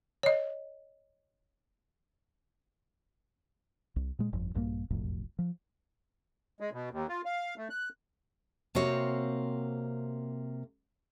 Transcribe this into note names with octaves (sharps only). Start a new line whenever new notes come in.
C#5 D#5
C2
A#2 G#3
G1 F2
A#1 G2 E3 A#3
E1 B1 F2 A2
F3
G#3
B2
D#2
F4
F5
A3
F#6
C3 A#3 C4 F#4 C#5